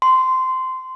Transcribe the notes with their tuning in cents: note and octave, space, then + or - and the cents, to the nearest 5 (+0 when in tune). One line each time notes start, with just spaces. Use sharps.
C6 -15